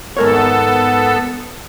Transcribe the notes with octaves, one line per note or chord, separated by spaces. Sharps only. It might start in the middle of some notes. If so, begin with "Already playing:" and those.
G#2 B3 A4 A#4 C#5